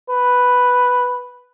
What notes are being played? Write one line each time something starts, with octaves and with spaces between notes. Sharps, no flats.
B4